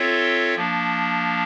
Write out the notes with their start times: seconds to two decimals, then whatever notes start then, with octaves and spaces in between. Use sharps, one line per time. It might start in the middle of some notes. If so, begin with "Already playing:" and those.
Already playing: C4 F4 A4 C#5 E5
0.56 F3 A#3 D4